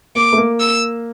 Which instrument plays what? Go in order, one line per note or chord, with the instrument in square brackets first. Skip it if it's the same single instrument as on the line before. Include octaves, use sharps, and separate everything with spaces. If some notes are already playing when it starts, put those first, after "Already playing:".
[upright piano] A#3 [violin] D6
[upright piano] A3
A#3
[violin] E6